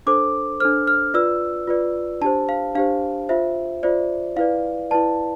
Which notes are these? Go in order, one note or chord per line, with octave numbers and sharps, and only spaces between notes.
D4 A4 C5 D6
D4 A4 C5 F6
F6
F4 B4 D5 E6
F4 B4 D5
D4 G4 C5 A5
F5
D4 G4 C5 F5
F4 C5 E5
F4 C5 D5
E4 B4 D5 F5
E4 B4 D5 A5